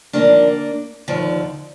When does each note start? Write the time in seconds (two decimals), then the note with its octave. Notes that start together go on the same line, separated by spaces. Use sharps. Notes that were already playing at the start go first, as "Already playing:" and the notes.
0.13 D#2 D3 F3 A#3 D4
1.08 D#2 D3 F3